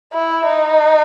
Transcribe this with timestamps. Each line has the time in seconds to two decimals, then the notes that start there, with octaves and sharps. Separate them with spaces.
0.13 E4
0.46 D#4